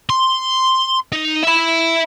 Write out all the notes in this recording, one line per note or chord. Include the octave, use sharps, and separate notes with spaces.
C6
D#4
E5 B5